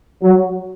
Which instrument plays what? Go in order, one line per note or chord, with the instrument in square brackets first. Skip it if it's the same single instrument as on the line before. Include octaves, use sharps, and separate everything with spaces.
[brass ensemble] F#3